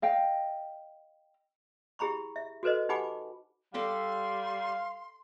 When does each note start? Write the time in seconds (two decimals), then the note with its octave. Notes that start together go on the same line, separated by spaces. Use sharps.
0.02 D#5 F5 G5
1.99 E4 G4 G#4 A#5 B5 C#6
2.36 E5
2.63 F#4 A4 B4 C5 D#5
2.89 D#4 G4 F#5 G#5 B5 D6
3.74 G3 G4 A4 D5 F5 C6